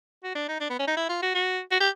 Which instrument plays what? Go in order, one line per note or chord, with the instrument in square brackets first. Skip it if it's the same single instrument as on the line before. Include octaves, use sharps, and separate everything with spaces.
[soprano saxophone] F#4
D4
D#4
D4
B3
C#4
D#4
E4
F4
F#4
F#4
F#4
G4